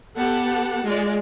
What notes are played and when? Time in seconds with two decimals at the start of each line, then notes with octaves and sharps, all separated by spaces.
0.16 B3 G4 A4 F#5 A5
0.85 G#3 F4 D5